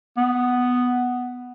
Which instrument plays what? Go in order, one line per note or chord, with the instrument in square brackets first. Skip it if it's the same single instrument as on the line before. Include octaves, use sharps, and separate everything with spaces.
[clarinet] B3